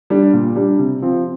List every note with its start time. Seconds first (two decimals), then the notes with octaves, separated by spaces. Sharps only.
0.10 G3 D4
0.34 A#2
0.56 G3 D4
0.79 C3
1.02 F3 C4